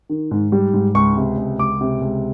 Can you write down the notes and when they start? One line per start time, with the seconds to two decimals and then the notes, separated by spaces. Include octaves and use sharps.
0.09 D#3
0.31 G#2
0.52 G3
0.74 G#2
0.95 C#2 C#6
1.16 C3
1.37 C#2
1.58 C#2 D6
1.81 C3
2.01 C#2